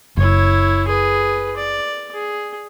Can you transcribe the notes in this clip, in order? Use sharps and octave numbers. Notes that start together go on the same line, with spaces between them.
F#1 E4 C#5
G#4 B4
D5
G#4